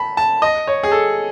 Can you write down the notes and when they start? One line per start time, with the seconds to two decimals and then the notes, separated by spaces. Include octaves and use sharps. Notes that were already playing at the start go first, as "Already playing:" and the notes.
Already playing: A5 B5
0.17 A5
0.42 D#5
0.67 C#5
0.83 G#4
0.92 A4